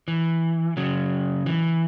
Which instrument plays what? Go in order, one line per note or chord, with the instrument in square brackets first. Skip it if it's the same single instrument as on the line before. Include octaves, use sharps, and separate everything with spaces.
[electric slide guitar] E3
C#3 F#3
E3